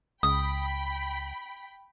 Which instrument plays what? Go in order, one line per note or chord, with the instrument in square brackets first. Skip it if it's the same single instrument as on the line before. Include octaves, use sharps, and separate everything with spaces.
[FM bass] C#2 [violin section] G5 B5 [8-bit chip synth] D#6